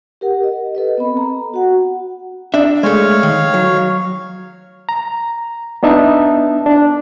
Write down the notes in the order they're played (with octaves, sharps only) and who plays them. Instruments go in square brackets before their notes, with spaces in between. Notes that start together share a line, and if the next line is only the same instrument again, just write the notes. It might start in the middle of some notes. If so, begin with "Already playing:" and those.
[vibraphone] G4 A#4 F#5
D#5
A4 B4 D#5
B3 C4 B5
A#5
F#4 F#5
[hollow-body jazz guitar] D4 E5
[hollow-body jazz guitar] G#3 A3 [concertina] C#5 F5
[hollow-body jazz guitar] D#3
F#3
[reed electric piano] A#5
B3 D4 D#4 E5 A5
D4